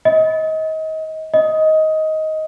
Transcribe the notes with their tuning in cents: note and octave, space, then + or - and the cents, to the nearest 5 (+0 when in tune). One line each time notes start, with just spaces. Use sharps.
D#5 +30
D#5 +15